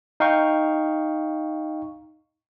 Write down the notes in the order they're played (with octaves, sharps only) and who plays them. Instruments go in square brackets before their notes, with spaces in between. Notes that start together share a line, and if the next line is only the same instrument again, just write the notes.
[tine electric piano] D#4 F5 G5 C#6